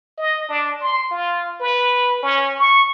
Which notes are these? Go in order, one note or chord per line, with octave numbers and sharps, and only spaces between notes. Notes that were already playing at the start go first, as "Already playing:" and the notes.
D#5
D4
C6
F4
B4
C#4
C#6